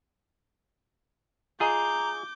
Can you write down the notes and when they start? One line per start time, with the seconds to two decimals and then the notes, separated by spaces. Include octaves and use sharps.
1.60 F4 G#4 D#5 A#5 D6 G6